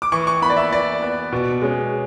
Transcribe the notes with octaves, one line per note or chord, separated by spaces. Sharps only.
D6
E3 C#6
C#6
B3 B5
D5
E5
E3 D5
B3
B2
G#3 C#4